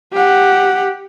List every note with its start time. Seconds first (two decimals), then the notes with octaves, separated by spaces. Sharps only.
0.13 G4 F#5